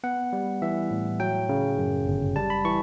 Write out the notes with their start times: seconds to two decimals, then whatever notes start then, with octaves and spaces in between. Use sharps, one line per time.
0.04 B3 F#5
0.33 G3
0.62 E3 E5
0.91 A2
1.20 F#3 G5
1.49 C#3
1.78 F#2
2.06 G1
2.36 G3 A5
2.50 B5
2.65 E3 C#6